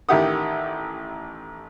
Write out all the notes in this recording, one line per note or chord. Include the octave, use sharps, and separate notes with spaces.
A1 D#3 E4 G4 F#5 D#6